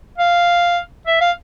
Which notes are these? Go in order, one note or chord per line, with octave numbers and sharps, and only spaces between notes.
F5
E5
F5